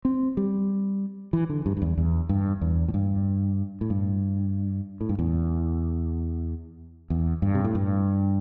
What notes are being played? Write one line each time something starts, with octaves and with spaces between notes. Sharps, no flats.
C4
G3
E3
D3
G2
G2
E2
E2
G2
E2
A2
G2
A2
G2
A2
G2
E2
E2
G2
C3
A2
G2